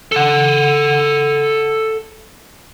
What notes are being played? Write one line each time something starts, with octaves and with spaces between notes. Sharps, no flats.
A4 F#5